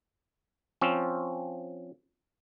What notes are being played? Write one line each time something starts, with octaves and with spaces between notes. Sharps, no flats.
F3 C4 C#4